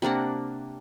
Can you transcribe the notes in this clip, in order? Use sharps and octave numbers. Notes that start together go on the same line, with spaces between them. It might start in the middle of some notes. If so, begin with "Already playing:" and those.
C3 A#3 D4 F#5